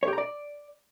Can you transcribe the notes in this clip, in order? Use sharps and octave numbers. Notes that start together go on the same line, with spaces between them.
C#5
G4
A#5
D5